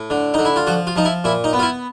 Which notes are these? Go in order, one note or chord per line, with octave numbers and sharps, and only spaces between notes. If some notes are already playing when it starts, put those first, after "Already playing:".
Already playing: A2
D3
D3 D#4
E4
F4
F3 F#4
F4
F3 D#4
E4
A#2 E4
D#4
B3
F4
E4